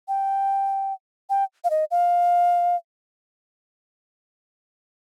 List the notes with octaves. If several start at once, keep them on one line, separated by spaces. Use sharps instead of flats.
G5
G5
F5
D#5
F5